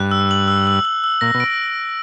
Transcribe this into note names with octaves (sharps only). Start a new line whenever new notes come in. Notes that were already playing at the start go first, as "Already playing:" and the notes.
Already playing: G2 F#6
E6
F#7
E6
E6
E6
E6
A#2 A#6
B2
D7